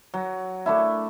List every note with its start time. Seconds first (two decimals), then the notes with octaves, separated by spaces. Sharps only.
0.14 F#3
0.66 A3 D4 E4